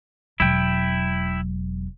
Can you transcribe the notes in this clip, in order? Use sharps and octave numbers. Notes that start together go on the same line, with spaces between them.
E1 F#3 E4 G5